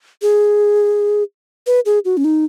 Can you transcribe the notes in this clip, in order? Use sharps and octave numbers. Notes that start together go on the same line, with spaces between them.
G#4
B4
G#4
F#4
C#4
D#4